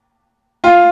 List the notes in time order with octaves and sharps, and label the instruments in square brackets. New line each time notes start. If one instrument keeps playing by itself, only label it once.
[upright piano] F4